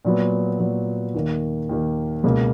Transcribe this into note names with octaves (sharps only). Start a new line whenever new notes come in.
A#2 F#3 B3
A#2 F#3 B3
D#2 D#3 A#3
D#2 D#3 A#3
C#2 B2 A#3